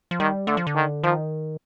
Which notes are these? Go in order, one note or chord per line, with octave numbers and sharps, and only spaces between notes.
F3
D#3 G3
D3 A3
F3
D3
D#3
D#3 F3